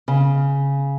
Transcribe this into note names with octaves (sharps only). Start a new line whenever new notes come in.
C#3